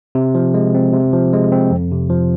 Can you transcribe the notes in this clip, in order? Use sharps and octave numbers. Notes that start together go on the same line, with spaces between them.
C3
F3
G#3
C4
C3
F3
G#3
C4
F2
C3
F3